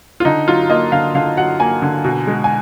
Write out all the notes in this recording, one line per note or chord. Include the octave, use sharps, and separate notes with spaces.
F4
D3 D#4
F#3 F4
A#3 D#5
D3 F5
D3 F5
F#3 F#5
A#3 G#5
D3
B2
G#3
G#5